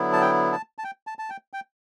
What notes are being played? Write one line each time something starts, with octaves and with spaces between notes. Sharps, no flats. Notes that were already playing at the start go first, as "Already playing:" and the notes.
Already playing: D3 F#3 B3 E4
A5
G5
A5
A5
G5
A5
A5
G5
G5